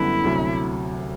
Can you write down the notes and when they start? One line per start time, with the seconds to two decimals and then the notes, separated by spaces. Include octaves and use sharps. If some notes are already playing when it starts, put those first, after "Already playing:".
Already playing: F#2 D3 G3 B3 E4
0.24 D2 C3 F#3